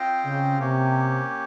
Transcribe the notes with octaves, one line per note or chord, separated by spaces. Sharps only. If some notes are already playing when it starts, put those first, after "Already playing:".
Already playing: C4 F4 C5 D#5 G5
C#3
C3 A#3 C#4 G4 C#5